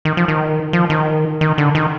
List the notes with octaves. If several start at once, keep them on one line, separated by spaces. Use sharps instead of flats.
D#3
F3
D#3
F3
D#3
D#3
D3
D#3